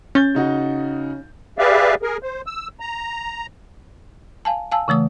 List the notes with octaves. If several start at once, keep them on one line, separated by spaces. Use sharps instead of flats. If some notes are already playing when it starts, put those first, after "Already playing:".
C#4 G6 A6 G7
C#3 D#4 F#4
G4 G#4 B4 D5 E5 F5
G#4 A#4
C5
E6
A#5
F5 G#5 A5
F5 G#5 A5 E6
C#3 E3 A3 D#6